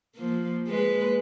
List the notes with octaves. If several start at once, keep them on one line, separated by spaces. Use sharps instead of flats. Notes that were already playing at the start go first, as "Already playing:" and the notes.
F3 A#3
G#3 A#3 B4